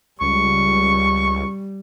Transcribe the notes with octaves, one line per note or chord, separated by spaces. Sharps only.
C#2 G3 C#6